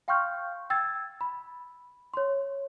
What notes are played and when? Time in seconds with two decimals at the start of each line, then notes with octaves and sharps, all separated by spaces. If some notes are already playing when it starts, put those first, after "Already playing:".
0.08 F5 G5 C6 C#6 F6 G6
0.70 G5 E6 G#6 A6
1.21 B5
2.14 C#5 C6